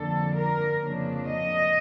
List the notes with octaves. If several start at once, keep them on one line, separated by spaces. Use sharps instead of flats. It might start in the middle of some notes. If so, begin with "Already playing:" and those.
Already playing: F2 D3 F3 A#3 D4 A4
A#4
F2 C#3 F3 A#3 D4
D#5